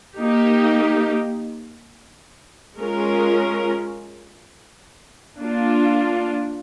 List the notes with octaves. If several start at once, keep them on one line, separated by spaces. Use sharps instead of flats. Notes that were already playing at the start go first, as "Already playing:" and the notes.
A#3 D#4 G4
G#3 C#4 F4 A#4
A#3 D4 F4